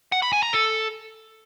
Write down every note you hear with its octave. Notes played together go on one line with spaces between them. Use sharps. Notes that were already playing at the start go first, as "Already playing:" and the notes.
F#5
B5
G#5
A#5
A4